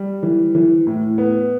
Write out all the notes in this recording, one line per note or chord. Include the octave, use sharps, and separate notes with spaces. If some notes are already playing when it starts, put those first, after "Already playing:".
Already playing: G3
E3
E3
A2
B3